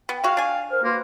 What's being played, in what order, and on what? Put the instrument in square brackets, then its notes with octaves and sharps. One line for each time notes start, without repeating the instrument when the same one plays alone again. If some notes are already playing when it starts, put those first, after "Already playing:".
[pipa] B3 [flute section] G5
[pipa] G#3 F#4 [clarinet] F5
[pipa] D4 G#5
[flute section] A#4 C5 F6
[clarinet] A#3 [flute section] F#4 B4 C6